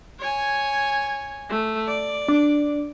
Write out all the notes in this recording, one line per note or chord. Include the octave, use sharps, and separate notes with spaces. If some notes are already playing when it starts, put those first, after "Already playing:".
C#5 G#5
A3
D5
D4